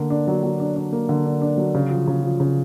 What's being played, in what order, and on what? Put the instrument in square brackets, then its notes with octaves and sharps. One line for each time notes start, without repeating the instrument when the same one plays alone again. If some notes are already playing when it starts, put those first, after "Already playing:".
Already playing: [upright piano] D3 A#3
D4
F#3
F#3
D4
D4
A#3
D3
D4
D4
F#3
C#3
F3
C#3
F3
C#3